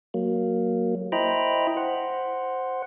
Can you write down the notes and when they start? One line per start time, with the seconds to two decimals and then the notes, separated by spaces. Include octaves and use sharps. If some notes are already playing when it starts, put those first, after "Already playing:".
0.14 F#3 A#3
1.12 E4 C5 D#5 G5 A#5 B5
1.77 C5 F#5